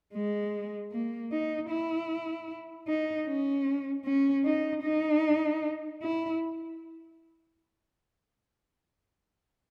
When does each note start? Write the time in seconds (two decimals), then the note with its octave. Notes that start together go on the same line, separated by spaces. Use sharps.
0.14 G#3
0.92 A#3
1.32 D#4
1.70 E4
2.88 D#4
3.27 C#4
4.05 C#4
4.45 D#4
4.84 D#4
6.03 E4